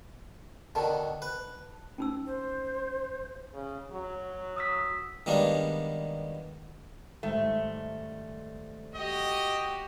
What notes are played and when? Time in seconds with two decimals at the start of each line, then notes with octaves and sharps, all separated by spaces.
0.75 B2 D3 D#3 A5
1.22 B4
1.98 C#4 D#4 E6
2.27 C5
3.54 C#3
3.91 F#3
4.56 D#6 E6 B6
5.26 D#3 G3 G#3 A#3 B3 D4
7.23 G#2 D#3 G3 A3
8.96 F#4 G4 D#5